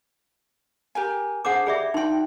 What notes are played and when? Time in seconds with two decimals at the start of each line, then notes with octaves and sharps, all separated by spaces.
0.95 G4 A#4 G#5
1.45 D4 G#4 C5 F#5 D6
1.67 G4 G#4 D5 E5
1.94 D#4 F#4 G5 C6